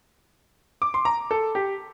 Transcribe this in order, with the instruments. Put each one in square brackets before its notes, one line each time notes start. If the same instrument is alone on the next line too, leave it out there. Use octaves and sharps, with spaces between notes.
[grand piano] D6
C6
A#5
A4
G4